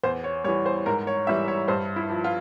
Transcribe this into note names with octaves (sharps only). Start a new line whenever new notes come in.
E2 C5
C#5
E3 G3 C#5
C5
G#2 A#4
C#5
E3 G3 E5
C#5
G2 C5
E4
F3
F4